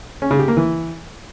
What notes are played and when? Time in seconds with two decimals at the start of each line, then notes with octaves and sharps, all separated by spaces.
0.22 C#4
0.31 C#3
0.39 G4
0.48 A#3
0.57 E3